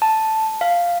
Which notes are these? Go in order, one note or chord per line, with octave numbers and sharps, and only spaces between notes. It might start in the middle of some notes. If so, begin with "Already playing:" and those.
A5
F5